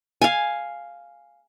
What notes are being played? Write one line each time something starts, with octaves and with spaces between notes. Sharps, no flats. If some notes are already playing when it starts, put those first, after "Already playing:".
F5 G#5